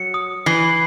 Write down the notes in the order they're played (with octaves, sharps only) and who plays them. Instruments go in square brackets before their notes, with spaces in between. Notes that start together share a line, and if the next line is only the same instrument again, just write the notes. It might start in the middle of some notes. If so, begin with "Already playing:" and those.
Already playing: [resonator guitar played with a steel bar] F#3 [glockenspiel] C#7
[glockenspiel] D#6
[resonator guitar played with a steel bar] E3 [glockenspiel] C7